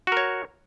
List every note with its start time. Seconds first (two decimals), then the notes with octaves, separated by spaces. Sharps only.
0.07 F#4
0.12 A#4
0.17 C#5